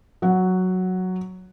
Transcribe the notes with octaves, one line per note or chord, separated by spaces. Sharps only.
F#3 F#5